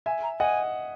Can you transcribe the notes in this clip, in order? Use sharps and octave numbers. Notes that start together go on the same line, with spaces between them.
E5 G#5
A#5
D#5 F#5 G#5